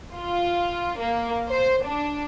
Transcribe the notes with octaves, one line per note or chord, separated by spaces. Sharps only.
F4
A#3
C5
D4